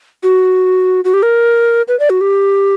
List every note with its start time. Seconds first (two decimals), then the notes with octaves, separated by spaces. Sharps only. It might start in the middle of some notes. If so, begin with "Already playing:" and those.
0.23 F#4
1.05 F#4
1.14 G4
1.23 A#4
1.88 B4
2.00 D5
2.10 F#4
2.21 G4